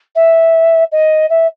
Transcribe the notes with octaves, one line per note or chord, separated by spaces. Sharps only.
E5
D#5
E5